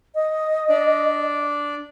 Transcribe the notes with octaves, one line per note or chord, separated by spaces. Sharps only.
D#5
D4 D5